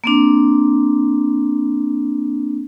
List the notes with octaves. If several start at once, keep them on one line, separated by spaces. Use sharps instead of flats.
A#3 C4 D4